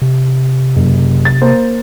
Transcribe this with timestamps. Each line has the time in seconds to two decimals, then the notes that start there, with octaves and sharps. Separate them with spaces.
0.02 C3
0.76 F#1
1.25 A6
1.42 A#3 C5